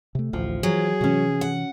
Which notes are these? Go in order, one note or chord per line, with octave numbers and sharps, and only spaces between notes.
C3 A3
A1 D2 F3
E3 F#3 G#4
C3 E3 C#4 F#4
F#5